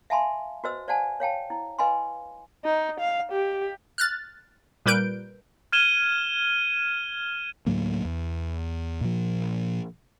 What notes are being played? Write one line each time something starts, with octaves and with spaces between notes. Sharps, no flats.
E5 F5 G#5 A5 B5 C6
F#4 B4 C5 D#5 E6
C5 D5 F5 F#5 G#5 A5
C#5 F5 G5 A5
E4
B4 D#5 F5 G#5 B5 C6
D#4
F5
G4
F6 F#6 A6
A#2 G3 A#4 B4 G6 D7
F6 G#6 D#7 E7 G7
D2 A2 F#3 A#3
E2
A#2 F3